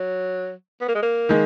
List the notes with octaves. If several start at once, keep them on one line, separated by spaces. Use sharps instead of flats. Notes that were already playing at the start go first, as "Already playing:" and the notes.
Already playing: F#3
B3
A#3
G#3
A#3
D#3 G#3